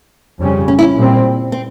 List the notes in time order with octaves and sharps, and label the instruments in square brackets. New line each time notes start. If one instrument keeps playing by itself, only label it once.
[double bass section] F2 C#3 G3 C#4
[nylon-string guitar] C#4
E4
C#4
[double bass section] A#2 G3 C4
[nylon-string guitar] C4